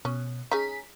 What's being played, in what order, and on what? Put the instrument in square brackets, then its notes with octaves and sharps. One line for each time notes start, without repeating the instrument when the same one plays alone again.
[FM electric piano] B2 [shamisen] C#4
[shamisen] C#4 D#4 [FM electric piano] G#4 B6